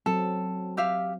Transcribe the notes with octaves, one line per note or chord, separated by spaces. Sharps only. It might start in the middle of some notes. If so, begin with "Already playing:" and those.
F#3 C4 A4
G4 E5 F5